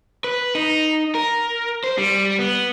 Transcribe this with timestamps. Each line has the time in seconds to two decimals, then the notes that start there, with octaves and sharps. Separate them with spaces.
0.24 B4
0.55 D#4
1.15 A#4
1.84 C5
1.98 G3
2.39 B3